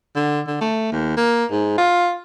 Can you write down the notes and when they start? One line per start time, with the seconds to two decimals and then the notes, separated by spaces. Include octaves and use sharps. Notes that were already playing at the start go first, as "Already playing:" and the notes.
0.16 D3
0.47 D3
0.61 A3
0.92 D#2
1.17 A#3
1.51 G#2
1.78 F4